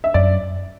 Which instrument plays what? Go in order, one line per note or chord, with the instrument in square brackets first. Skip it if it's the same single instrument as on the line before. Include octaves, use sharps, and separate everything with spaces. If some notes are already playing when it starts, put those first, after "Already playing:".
[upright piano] E5
[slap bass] F#2 [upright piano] D5